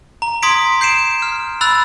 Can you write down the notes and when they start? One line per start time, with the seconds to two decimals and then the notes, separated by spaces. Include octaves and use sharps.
0.22 A#5
0.43 C6 D#6 G#6 B6 D7
0.81 G6 C7 D7 E7
1.22 F6
1.61 B5 E6 F#6 A6 F7